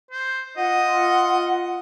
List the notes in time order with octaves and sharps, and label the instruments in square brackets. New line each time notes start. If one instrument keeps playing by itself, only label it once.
[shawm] C5
[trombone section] F4 [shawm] D#5 [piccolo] F#5